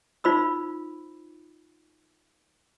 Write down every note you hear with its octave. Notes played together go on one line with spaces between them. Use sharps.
D#4 F4 C5 B5 E6